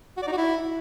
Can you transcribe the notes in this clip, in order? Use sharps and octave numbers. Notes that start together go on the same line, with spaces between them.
F#4
D5
D#4
F#4
E4